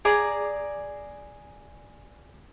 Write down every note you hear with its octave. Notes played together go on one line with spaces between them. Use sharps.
G#4 D5 A#5